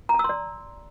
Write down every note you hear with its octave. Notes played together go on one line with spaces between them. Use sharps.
A#5
A5
E6
C6
D5